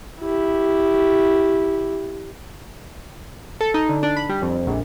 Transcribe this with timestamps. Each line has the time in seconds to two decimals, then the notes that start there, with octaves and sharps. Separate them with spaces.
0.20 E4 G4
3.61 A4
3.74 D#4
3.89 D3
4.03 D4
4.17 B5
4.29 G3
4.42 F2
4.67 A#1